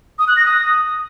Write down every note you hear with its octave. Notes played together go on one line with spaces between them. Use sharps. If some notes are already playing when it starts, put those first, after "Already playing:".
D#6
F#6
A#6
D#6